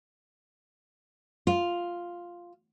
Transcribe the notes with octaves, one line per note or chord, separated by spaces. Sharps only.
F4